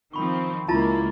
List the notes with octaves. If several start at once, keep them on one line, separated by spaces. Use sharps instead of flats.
D#3 F3 C4 B5 C#6
C#2 A#3 E4 F4 A5 A#5 A6